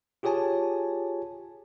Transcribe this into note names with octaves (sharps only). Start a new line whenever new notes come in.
F4 G4 G#4 C#5 G#5 A5